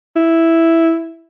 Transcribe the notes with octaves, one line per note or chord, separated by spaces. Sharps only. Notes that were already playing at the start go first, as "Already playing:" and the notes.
E4